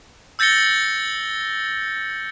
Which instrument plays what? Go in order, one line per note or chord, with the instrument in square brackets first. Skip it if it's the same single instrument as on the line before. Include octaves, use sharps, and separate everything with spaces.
[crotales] E6 G6 A6 A#6 C#7 G7